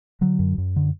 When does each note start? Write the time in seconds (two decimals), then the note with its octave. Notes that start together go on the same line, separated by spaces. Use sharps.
0.21 D3 F#3
0.39 F#2
0.58 F#2
0.76 D3